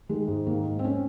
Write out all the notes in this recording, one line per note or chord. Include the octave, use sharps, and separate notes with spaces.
D#3 G#3
G#2
D#3 A#3
G#2
C4
C#4